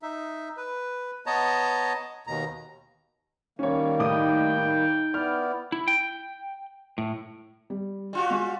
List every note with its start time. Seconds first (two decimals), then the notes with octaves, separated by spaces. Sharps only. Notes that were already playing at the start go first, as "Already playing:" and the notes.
0.02 D#4 E5
0.57 B4
1.26 B3 C#5 D#5 A5 A#5
2.27 D#2 B2 A#5
3.59 D#3 G3 A#3 C#4 C#5
3.99 A2 D#4 G5 D6 D#6
5.14 B3 E4 D5 F6
5.72 E4
5.88 G5
6.98 A2
7.70 G3
8.13 G3 F4 F#4
8.30 G#3 G#5